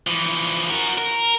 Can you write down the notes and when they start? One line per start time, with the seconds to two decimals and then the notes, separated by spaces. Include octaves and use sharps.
0.07 E3 F3
0.69 F#4 A#4
0.98 A#4